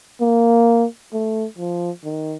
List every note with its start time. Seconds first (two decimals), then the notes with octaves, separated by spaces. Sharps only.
0.21 A#3
1.13 A3
1.58 F3
2.04 D#3